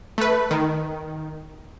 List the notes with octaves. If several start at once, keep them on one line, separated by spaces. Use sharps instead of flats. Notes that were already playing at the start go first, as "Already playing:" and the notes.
A3 B4
D#3